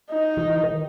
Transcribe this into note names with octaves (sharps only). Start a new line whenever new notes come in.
D#4
E3
D#3